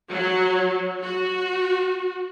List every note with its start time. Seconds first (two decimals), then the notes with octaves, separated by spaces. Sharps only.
0.11 F#3
1.01 F#4